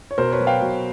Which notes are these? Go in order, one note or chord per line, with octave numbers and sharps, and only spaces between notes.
C#5
B2 A#4 C5
B4 C#5
F#3
F5 G5
B2